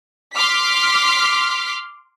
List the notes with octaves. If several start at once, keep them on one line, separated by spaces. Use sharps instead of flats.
C6 D6 F6 B6